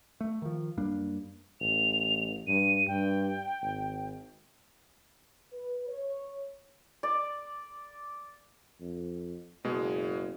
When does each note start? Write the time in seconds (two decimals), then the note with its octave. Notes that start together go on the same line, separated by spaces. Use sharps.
0.21 A3
0.42 D#3 F3
0.77 F#2 G3 A#3 D4
1.61 A1 F7
2.47 G2 D#7
2.88 G2 G5
3.62 G#1
5.53 B4
5.88 C#5
7.03 D5
8.81 F2
9.64 F#1 B2 G#3